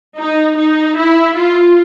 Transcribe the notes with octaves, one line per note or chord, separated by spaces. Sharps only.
D#4
D#4
E4
F4